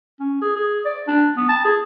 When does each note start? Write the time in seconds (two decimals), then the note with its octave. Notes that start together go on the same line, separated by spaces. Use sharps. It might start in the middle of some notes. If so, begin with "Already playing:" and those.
0.20 C#4
0.42 G#4
0.56 G#4
0.85 D5
1.08 D4
1.37 B3
1.49 A5
1.65 G#4